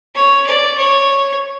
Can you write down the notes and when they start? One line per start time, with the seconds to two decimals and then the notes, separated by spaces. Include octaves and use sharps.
0.15 C#5
0.46 D5
0.77 C#5